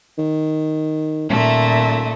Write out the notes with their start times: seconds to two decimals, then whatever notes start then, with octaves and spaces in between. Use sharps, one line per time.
0.18 D#3
1.30 D#1 A#2 A3 E5